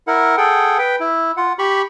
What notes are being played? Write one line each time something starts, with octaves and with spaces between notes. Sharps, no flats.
E4 A#4 F#5
G#4 A4 F#5 G5
B4 G5
E4
F4 F#5
G4 B5 C#6